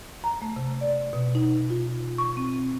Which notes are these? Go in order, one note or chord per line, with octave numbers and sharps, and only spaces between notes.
A#5
A3
C3
D5
B2
D#4
F4
C#6
C4